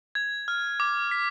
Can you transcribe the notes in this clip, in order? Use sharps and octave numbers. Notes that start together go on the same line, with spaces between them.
G#6
F6
D6
B6